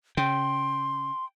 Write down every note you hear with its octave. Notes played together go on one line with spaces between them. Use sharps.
C#3 G5 C6